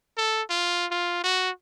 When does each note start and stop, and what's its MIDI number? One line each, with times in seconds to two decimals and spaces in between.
0.17 0.43 69
0.50 0.86 65
0.91 1.22 65
1.24 1.50 66